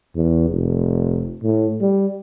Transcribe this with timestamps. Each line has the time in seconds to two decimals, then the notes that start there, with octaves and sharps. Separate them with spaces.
0.16 E2
0.50 F1
1.43 A2
1.81 G3